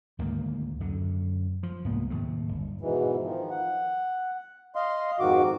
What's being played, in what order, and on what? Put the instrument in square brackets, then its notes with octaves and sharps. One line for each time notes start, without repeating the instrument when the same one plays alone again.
[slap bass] D2 G#2 D#3 A#3
F#2 D3
F3
C2 G#2 A#3 B3
D#2 A2 C3
G1
[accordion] G#2 B2 E3
D#3 F3
F#5
D#5 F5 C6
F2 G#2 D#3 F#4 D6